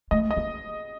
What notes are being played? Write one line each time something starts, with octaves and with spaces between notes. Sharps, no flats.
A3 D#5
D#5
A#3